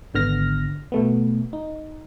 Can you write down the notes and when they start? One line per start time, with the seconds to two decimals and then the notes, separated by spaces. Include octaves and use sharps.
0.14 G#1 D3 B3 F6 A#6
0.92 B2 A3 B3
1.53 D#4